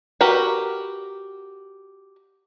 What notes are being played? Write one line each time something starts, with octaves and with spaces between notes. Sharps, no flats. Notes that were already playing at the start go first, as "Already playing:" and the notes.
F#4 G4 A#4 B4